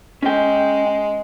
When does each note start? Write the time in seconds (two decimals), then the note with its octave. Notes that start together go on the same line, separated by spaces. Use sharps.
0.23 G#3 C#4 G5